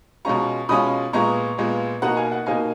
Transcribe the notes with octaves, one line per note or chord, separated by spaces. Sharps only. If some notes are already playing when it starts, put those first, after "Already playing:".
B2 G#3 C#4 F4 A#5 C#6
B2 G#3 C#4 F4 B5 D#6
A#2 G#3 B3 F4 A#5 C#6
A#2 G#3 B3 F4
B2 A#3 D#4 F#5 A#5
F5 G#5
F#5
B2 A#3 D#4 F5 G#5